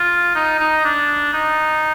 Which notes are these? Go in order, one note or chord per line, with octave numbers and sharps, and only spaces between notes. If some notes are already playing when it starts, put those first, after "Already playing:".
Already playing: F4
D#4
D#4
D4
D#4